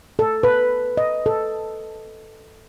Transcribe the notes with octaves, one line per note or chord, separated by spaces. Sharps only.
A4
B4
D#5
A4